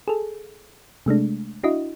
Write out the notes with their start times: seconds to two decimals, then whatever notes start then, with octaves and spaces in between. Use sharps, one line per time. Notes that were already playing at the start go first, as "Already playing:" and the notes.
0.08 G#4 A4
1.06 C3 G#3 A3 D4
1.64 D4 E4 F#4 D#5